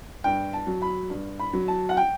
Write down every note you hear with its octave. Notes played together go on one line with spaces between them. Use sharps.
G2 G5
A5
F#3
B5
G2
B5
F#3
A5
F#5
G5